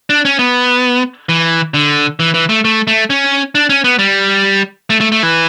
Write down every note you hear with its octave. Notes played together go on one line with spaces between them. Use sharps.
D4
C#4
B3
E3
D3
E3
E3
A3
A3
A3
C#4
D4
C#4
B3
G3
A3
A3
A3
E3